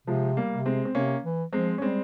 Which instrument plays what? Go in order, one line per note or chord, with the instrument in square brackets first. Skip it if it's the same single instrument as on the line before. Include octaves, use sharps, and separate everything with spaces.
[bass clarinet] C3 [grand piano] F3 G#3
[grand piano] G3 A#3
[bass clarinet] C3
[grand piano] G#3 C4
C4
[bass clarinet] C3 [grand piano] A#3 C#4
[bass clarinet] E3
[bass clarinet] F3 [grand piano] G#3 C4
[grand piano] C#4
[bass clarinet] G3 [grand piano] G#3 C4